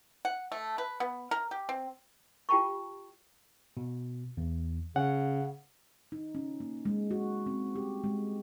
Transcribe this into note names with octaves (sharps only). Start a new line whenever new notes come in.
F#5
A3
B4
B3
A#4
G4
C4
F4 G4 G5 A5 B5 C#6
B2
E2
C#3 C#4 F#5
D#4
C#4
A#3
G#3
F#4
C4
G4
G#3